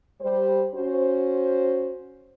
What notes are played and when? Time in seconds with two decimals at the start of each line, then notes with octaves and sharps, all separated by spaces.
0.21 G3 C5
0.75 C#4 F#4 C5